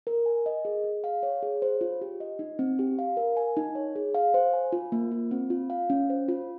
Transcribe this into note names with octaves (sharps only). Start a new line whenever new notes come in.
A#4
G#5
D#5
G#4
G#4
F5
C#5
G#4
C5
F4
G4
D#5
D#4
C4
G4
F5
A#4
G#5
D#4
C#5
G#4
F5
C5
G#5
F4
A#3
F4
C4
F4
F5
C#4
C5
F4